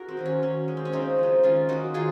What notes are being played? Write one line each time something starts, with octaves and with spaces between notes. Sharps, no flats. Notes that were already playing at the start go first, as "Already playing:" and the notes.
Already playing: F#4 G#4 A#4
C4
D#3 F#3 A#3
C#4
D#3 C#4
G#3
C4
C#4
C#3 C4 D#4
F3 G#3
D#3 C#4 F4
F#3 A#3 D#4 F#4
D#3 F4 G#4